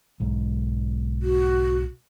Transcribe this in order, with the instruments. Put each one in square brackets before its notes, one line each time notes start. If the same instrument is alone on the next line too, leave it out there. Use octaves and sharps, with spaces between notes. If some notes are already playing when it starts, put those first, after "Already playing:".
[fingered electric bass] B1 G#2
[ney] F#4